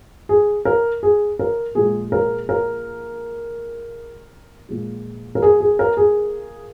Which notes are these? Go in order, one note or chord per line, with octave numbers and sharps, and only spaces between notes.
G#4
A#4
G#4
A#4
A#2 F3 G#3 G#4
A#4
A#4
A#2 F3 G#3
A#4
G#4
G#4
A#4
G#4